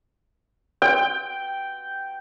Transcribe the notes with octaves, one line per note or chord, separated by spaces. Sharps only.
G5